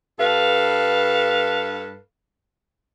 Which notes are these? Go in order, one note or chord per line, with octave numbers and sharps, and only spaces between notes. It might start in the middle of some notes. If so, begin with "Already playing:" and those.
G2 A4 B4 F5